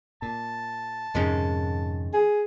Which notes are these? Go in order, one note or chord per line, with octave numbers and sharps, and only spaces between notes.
A#2 A5
F2 G#2 C3 D#3 G#3 C#4
G#4